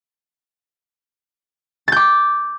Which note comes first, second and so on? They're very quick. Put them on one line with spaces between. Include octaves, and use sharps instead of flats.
A6 G6 D6